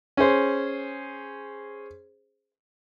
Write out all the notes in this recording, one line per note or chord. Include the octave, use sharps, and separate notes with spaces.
C#4 G#4 C5